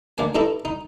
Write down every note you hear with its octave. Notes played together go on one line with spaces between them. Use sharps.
D2 D3 A#3 G#5
G2 D#4 E4 A4 A#5
D#4